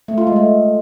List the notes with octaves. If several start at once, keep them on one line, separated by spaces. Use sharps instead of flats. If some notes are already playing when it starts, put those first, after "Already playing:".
A3
F4
G#3
A3